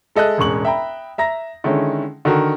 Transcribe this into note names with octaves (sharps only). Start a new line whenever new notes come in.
G#3 A4 D#5 E5 F#6
E1 A1 G#3 C#6 F#7
E5 G5 A#5 B5
E5 A#5 A#6
D3 D#3 G#3 C#4 E4
D3 D#3 F#4 A#4